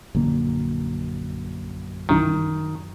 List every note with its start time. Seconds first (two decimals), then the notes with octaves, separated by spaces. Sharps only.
0.15 A#1 F#2 D3 A#3
2.09 C2 G2 D#3 E3